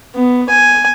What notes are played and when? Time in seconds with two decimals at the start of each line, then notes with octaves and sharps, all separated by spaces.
0.15 B3
0.49 G#5